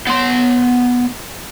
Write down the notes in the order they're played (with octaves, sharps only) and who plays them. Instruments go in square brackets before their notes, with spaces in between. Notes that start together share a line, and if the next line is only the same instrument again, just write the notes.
[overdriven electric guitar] B3 C6